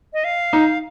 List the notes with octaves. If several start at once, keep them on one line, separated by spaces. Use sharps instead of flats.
D#5
F5
D#4